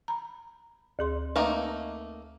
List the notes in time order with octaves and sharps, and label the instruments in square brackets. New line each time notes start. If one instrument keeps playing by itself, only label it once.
[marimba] A#5 B5
D2 G#4 C6
[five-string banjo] A3 A#3 D#4 [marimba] B4 A#5 D6